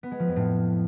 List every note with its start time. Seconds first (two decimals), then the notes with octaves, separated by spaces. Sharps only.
0.03 B3
0.11 G#3
0.20 F3
0.28 F2
0.36 A2